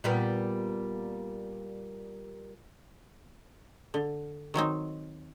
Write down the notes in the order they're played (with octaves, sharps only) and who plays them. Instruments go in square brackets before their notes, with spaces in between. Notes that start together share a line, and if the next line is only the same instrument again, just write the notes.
[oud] A#2 G3 B3
[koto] D3
D#3 F#3 C4 D#4